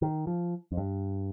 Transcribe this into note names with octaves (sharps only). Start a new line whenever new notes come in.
D#3
F3
F2
G2